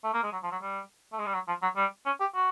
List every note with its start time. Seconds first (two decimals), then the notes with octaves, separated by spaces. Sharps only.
0.04 A3
0.13 A#3
0.23 G#3
0.32 F#3
0.43 F3
0.52 F#3
0.62 G3
1.12 A3
1.19 G#3
1.26 G3
1.34 F#3
1.48 F3
1.62 F#3
1.76 G3
2.06 C#4
2.20 G4
2.34 F#4